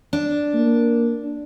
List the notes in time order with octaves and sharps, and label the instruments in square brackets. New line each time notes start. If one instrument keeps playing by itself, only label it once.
[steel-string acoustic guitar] D4
[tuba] A#3